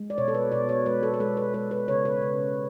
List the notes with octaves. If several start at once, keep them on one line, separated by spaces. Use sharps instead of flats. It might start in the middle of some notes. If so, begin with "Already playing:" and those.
Already playing: G#3
D5
B2 C#5
A4
B4
B2 D5
C#5
G#3 B4
A4
B4
G#3 A4
B4
G#3 B4
B4
C#3 C#5
B4
C#3